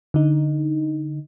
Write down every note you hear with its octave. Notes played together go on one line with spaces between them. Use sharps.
D3 D#4